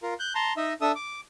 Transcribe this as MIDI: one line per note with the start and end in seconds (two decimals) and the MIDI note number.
0.03 0.14 65
0.03 0.14 70
0.19 0.33 90
0.19 0.33 91
0.35 0.53 81
0.35 0.53 82
0.35 0.53 84
0.57 0.73 63
0.57 0.73 75
0.57 0.73 76
0.81 0.92 62
0.81 0.92 69
0.81 0.92 76
0.81 0.92 87
0.81 0.92 88
0.95 1.21 86